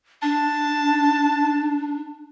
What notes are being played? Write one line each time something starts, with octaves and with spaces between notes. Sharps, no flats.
D4 A5